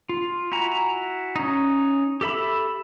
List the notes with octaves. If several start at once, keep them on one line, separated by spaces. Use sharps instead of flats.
F4
E4 F#4 G#5 A#5
C#4 D#4
G4 A4 E5 B5